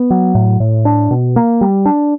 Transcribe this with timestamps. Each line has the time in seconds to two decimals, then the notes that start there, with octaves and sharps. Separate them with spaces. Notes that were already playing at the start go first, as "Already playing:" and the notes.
Already playing: B3
0.10 F#3
0.35 A2
0.60 A2
0.85 D4
1.11 B2
1.36 A#3
1.61 G3
1.86 D4